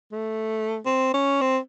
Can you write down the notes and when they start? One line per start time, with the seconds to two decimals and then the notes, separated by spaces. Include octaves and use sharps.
0.12 A3
0.85 C4
1.14 C#4
1.41 C4